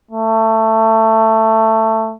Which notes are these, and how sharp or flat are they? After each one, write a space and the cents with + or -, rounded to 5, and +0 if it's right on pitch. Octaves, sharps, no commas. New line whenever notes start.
A3 +15